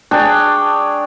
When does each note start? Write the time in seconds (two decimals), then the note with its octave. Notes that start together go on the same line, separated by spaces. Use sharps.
0.11 D4 G#4 C#5 G5